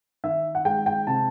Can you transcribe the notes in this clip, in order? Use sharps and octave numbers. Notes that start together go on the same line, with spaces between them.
D#3 E5
F#5
G#3 G5
G5
C3 A5